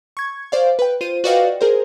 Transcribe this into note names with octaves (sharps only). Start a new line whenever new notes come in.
C#6 G#6
C5 D5 F5
B4 G5
F4 C5 D#7
F#4 B4 D5 D#5 F5 G5
G#4 A#4 C5